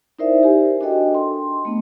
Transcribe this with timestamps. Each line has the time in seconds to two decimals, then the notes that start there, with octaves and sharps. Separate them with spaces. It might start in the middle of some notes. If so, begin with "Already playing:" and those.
0.19 D#4 E4 A#4 C5 D5 E5
0.43 G4 A#4 G#5
0.81 D4 F#4 A4 D#5 G5
1.15 C6
1.65 A3 B3 D4